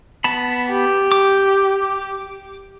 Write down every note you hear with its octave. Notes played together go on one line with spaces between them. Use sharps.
B3 A5 B5
G4
D6